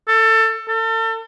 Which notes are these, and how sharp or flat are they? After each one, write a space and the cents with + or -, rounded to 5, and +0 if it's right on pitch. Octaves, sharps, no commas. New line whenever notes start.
A4 +25
A4 +40